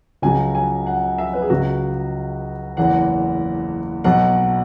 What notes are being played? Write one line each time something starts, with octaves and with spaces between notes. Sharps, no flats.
C#2 C#3 F#3 G#5
G#5
F#5
E5
B4
G#4
C#2 C#3 F#3 F#4
F#1 E2 E3 F#5
B1 B2 F#3 F#5